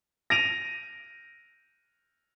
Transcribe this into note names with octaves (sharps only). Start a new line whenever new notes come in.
A#6 D7 D#7 F7